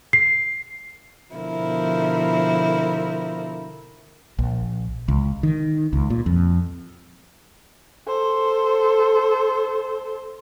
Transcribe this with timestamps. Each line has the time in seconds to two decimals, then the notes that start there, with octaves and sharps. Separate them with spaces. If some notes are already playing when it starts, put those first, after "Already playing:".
0.13 C7
1.35 B2 D3 F3 E4 A#4
4.39 A#1
5.08 C#2
5.43 D#3
5.93 C#2
6.10 A#2
6.26 F2
8.07 A4 C5